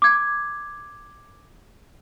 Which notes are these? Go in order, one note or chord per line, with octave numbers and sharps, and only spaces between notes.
D6 G#6